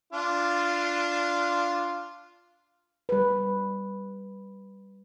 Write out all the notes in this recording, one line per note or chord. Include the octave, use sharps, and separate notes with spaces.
D4 F4
G3 B4